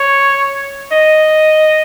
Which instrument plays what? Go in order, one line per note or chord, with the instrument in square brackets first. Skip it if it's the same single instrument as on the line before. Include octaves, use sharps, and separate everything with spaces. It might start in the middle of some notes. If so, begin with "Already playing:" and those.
Already playing: [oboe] C#5
D#5